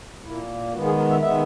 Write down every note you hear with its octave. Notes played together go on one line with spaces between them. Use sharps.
A#2 A#3 E4
D#3 G#3 B3 F#4
G#4
A#4
E5
D#3 G#3 B3 E5